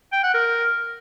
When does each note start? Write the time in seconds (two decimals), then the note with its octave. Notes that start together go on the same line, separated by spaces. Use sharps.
0.12 G5
0.23 F#5
0.34 A#4